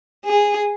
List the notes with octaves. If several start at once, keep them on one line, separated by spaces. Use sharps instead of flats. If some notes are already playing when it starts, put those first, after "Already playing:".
G#4